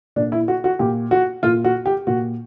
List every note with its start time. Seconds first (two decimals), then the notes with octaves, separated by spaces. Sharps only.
0.16 A#2 D4
0.32 E4
0.48 F#4
0.64 F#4
0.79 A#2 G4
1.11 F#4
1.43 A#2 F4
1.64 F#4
1.86 G4
2.07 A#2 F#4